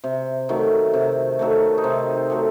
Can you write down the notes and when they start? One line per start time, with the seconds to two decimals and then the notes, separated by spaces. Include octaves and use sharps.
0.04 C3
0.49 D#3 F#3 A3
0.94 C3
1.39 D#3 F#3 A3
1.78 D#4
1.84 C3 C4
2.30 F#3 A3